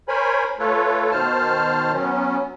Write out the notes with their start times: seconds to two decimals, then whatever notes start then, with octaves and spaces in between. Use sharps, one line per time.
0.08 A#4 C5 C#5 G#5 B5
0.59 A3 F4 A4 B4 C#5
1.11 B2 D#3 C5 A5 F6
1.93 F#3 B3 C#4